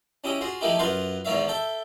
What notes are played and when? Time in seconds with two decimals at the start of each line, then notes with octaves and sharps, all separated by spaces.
0.24 C#4 E4 G4 D#5
0.41 F4 F#4 G#4
0.61 F3 A3 A#3 D#4 E4 G4
0.79 F#2 F4 B4 F5 F#5 C6
1.25 E2 G#2 D#3 C#5 E5 F5
1.48 A4 E5 G5